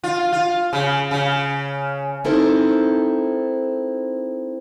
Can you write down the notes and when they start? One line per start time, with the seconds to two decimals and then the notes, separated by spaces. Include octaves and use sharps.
0.04 F4
0.32 F4
0.73 C#3
1.11 C#3
2.25 C4 D#4 E4 A4 A#4 C5